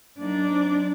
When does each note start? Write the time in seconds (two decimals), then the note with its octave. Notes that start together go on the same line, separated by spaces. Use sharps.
0.19 F#3 A#3 D4 D#4 D5
0.50 F#3 C4 D#4